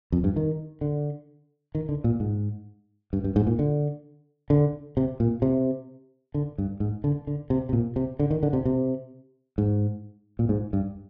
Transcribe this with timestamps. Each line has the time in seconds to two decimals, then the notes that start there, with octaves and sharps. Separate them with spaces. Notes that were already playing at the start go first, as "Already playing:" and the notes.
0.12 F2
0.24 G2
0.36 D#3
0.81 D3
1.75 D#3
1.89 D3
2.04 A#2
2.20 G#2
3.13 G2
3.24 G2
3.36 G#2
3.47 A#2
3.59 D3
4.50 D3
4.97 C3
5.20 A#2
5.42 C3
6.34 D3
6.58 G2
6.80 G#2
7.04 D3
7.27 D3
7.50 C3
7.69 C3
7.73 A#2
7.96 C3
8.19 D3
8.31 D#3
8.43 D3
8.53 C3
8.65 C3
9.58 G#2
10.39 A#2
10.49 G#2
10.73 G2